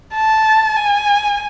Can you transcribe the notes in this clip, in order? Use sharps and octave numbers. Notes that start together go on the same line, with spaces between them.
A5
G#5